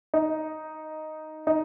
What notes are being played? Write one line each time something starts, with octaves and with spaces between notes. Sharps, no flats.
D#4
D#4